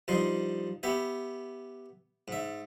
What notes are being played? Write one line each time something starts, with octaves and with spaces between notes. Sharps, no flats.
G2 F3 D#4 C6
B3 G4 E5
G#2 E5